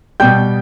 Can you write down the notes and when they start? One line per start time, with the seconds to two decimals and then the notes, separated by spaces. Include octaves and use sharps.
0.20 B2 G3 G5 G6